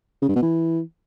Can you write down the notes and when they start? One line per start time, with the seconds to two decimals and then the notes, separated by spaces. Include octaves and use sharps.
0.22 C#3
0.29 G2
0.36 B2
0.42 E3